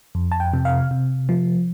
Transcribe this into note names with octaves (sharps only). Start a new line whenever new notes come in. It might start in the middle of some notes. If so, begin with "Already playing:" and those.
F2
A5
G5
C3
F5
C3
F3